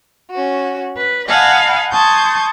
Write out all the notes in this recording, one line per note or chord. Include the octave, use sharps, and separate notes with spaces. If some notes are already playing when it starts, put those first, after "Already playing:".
C#4 F#4
B4
D#5 F5 F#5 G#5 A5 B5
A5 C6 C#6 D#6 G6 G#6